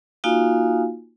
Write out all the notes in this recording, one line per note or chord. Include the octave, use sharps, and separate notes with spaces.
A#3 D#4 F4 F#4 F5 G#5